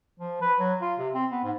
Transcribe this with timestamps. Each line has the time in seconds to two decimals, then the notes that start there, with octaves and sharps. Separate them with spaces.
0.19 F3
0.41 B4
0.60 F#3
0.81 F4
0.98 C3
1.14 C4
1.31 B3
1.44 G#2